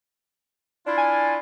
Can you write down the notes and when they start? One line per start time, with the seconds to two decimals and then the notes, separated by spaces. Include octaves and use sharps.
0.86 D4 E4 F4
0.98 G#5